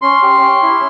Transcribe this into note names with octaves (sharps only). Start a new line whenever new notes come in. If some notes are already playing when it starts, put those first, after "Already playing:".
C#4 C6
G4
C#4
E4